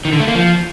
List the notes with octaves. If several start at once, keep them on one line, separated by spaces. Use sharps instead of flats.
D#3
D3
A3
A#3
F3